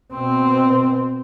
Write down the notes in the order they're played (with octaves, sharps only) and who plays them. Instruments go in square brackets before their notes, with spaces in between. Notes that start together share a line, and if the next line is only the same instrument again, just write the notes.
[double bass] B2 C4